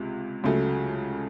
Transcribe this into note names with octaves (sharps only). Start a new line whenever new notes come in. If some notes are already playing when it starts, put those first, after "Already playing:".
Already playing: C#2 C3
C#2 C#3 F#3 A3